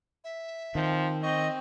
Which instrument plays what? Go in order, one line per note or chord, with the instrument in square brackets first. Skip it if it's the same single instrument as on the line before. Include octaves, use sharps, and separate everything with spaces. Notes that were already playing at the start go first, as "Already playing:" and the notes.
[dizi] E5
[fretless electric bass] D#3 [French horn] F3 [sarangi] C4
[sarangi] C4 [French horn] D#5 [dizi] C#6